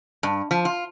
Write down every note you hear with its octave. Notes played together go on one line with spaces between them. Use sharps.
G2
F3
F4